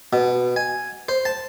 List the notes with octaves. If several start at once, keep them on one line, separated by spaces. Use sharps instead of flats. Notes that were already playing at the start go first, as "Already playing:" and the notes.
B2
G#5
C5
A5